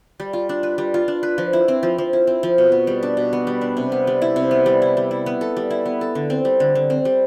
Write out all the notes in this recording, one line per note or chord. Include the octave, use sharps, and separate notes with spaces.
G3
F4
D4
B4
G3
F4
D4
B4
F3
E4
C4
F3
F3
E4
C4
F3
B2
B3
G3
D4
B2
B3
G3
D4
C3
B3
G3
E4
C3
B3
G3
E4
G3
E4
B3
A4
G3
E4
B3
A4
D3
C4
G3
D3
D3
C4
G3